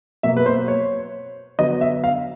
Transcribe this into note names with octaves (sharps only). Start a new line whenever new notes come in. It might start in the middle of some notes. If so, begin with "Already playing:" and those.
B2 F#3 A#3 E5
B4
C5
C#5
D3 F#3 B3 D#5
E5
F5